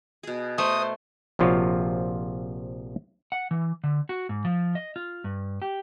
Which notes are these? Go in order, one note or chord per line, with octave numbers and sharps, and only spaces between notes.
B2 G#4
A3 C5 D#6
A#1 C3 F3 F4 F#4 C#5
F#5
E3
D3
F#4
G#2
F3
D#5
F4
G2
G4